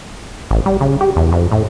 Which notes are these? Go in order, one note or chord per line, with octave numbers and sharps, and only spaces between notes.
A1
G3
C#3
G4
E2
F2
A2